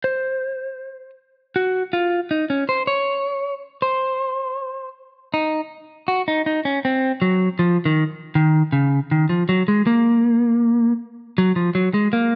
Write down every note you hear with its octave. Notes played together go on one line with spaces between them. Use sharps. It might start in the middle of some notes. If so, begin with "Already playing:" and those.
C5
F#4
F4
D#4
C#4
C5
C#5
C5
D#4
F#4
D#4
D#4
C#4
C4
F#3
F3
D#3
D#3
C#3
D#3
F3
F#3
G#3
A#3
F#3
F3
F#3
G#3
A#3